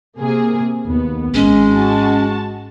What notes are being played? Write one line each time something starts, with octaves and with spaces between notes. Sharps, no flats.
C3 A#3 G#4
D#2 B3
G#1 G#3 C#4
F#4 A5